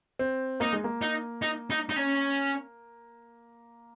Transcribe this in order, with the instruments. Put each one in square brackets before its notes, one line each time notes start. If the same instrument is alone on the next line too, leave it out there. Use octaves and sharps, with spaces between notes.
[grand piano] C4
[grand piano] A#3 [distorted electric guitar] D#4
[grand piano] G#3
A#3
[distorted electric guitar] D#4
D#4
D#4
D#4
C#4